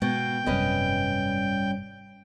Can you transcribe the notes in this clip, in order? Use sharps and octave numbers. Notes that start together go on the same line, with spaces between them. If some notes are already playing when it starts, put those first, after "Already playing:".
B2 G#3 G5
G#1 F#2 C3 G3 C#4 B4 D#5